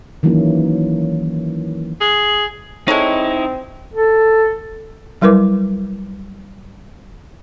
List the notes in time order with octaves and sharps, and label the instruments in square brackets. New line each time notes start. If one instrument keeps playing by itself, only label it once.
[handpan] D#3 E3 F#3 A#3 C#4 E4
[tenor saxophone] G#4
[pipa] G#3 A4 C#5 [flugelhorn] C4 [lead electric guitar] D#4 E4
[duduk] A4
[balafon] F#3 G3 E4 A#4 B4 D6